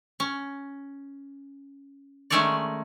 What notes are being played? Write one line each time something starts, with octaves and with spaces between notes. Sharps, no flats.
C#4
D#3 G#3 A3 C#4 C#5 D5